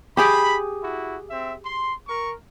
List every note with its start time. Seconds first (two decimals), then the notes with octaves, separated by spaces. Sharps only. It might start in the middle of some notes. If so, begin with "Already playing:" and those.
0.17 G4 G#4 G5 B5
0.82 E4 F#4
1.30 C4 E5
1.66 C6
2.08 A#4 C#6